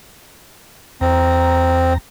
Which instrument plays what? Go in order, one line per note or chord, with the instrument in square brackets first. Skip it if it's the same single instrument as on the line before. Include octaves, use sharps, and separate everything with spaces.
[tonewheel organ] E2 A#5 [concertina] C4